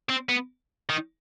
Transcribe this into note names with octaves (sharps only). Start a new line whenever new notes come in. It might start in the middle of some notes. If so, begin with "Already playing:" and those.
C4
B3
D#3